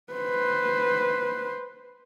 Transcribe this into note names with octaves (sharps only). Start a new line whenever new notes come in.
B4 C5